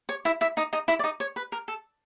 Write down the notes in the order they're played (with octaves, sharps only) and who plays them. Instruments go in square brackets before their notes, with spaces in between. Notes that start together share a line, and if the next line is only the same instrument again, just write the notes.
[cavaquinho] C#5
E4 E5
E4 E5
D#4 D#5
D#4 D#5
E4 E5
D5
D#4 D#5
C#5
B4
A#4
A4